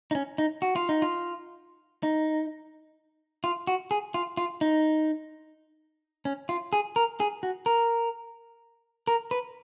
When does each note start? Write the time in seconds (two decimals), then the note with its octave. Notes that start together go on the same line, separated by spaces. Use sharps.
0.11 D#4
0.15 C#4
0.38 D#4
0.62 F#4
0.76 F4
0.89 D#4
1.02 F4
2.03 D#4
3.44 F4
3.67 F#4
3.91 G#4
4.14 F4
4.37 F4
4.61 D#4
6.25 C#4
6.49 F4
6.73 G#4
6.96 A#4
7.20 G#4
7.43 F#4
7.66 A#4
9.07 A#4
9.31 B4